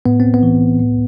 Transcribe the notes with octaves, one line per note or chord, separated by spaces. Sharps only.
A2 B3
C4
B3
E3
A2